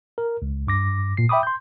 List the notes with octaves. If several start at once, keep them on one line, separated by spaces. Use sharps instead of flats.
A#4
C#2
G2 D6 A#6
A#2 C7
E5 G5 B5 D6 D#6
C6 G6